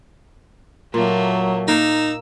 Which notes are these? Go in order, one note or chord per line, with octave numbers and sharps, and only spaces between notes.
A#2 F#3 A3 A#3
A#3 D#4 A#4 E6